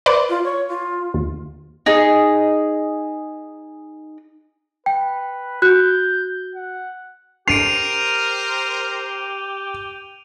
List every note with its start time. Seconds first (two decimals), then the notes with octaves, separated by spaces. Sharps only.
0.06 B4 C5 D5
0.29 F4
0.44 C#5
0.69 F4
1.14 D#2
1.86 D#4 G#4
4.86 B4 G5
5.62 F#4 F#6 G6
6.55 F#5
7.48 G4 A#4 C5 C7 D7 D#7 F7